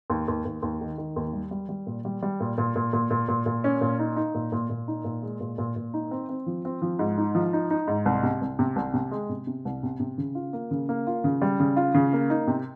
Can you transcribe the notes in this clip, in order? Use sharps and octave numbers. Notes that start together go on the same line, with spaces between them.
D#2
D#2
D#2
D#2
D#3
D#3
D#2
G3
G3
G3
A#2
G3
G3
A#2
A#2
A#2
A#2
A#2
A#2
A#2
C#4
A#2
D#4
D#4
A#2
A#2
A#2
D#4
A#2
G#3
A#2
A#2
A#2
D#4
C4
C4
F3
C4
F3
G#2
D#4
F3
D#4
D#4
G#2
C2
C3
C2
C3
C2
C3
G#3
C3
C3
C2
C3
C3
C#3
F4
A#3
C#3
A#3
F4
C#3
G3
C#3
F4
C#3
A#3
D#4
C3